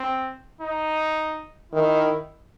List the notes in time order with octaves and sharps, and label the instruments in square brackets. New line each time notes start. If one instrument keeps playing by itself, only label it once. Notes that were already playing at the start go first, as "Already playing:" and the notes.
Already playing: [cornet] C4
D#4
[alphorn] D#3 [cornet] E4